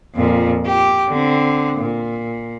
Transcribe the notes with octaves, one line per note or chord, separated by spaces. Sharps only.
F2 A#2
G4
D3 C4
A#2